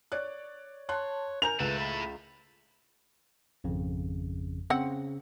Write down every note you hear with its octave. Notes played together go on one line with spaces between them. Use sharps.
C#5 D5 F#6
C#5 A5 C6 F#6
A#4 G#5 A#5 G6 F7
C#2 A3 E4 B4
B5
G#1 F2 C#3
C#3 C4 F#5